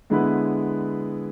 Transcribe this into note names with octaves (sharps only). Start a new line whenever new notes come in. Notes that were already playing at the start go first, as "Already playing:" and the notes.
D3 G#3 B3 E4 B4